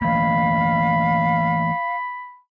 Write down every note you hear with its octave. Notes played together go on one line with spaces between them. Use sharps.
E3 A3 A#3 F5 B5